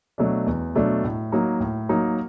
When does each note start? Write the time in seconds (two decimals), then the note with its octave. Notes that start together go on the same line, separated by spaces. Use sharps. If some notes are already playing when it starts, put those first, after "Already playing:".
0.18 B2 F#3 A3 D4
0.46 E2
0.75 B2 F#3 A3 D4
1.04 A2
1.32 F#3 A#3 D#4
1.60 A2
1.89 F#3 A#3 D#4